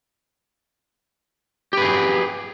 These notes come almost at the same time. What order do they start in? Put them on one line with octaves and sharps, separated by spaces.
G4 B4 G#4